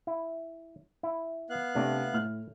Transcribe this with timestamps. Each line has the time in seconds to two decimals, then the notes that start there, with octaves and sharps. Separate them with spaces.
0.07 E4
1.03 E4
1.50 B3 F5 F#6
1.75 C3 A3 D4 D5
2.13 A2 F6